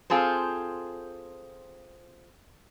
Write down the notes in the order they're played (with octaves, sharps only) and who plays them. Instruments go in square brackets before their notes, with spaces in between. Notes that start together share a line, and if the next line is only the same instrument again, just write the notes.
[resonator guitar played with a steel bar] C4 F4 G#4 A4 C5